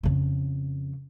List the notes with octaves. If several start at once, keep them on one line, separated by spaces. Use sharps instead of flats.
F2 C#3